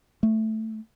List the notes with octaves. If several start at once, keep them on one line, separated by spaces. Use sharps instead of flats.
A3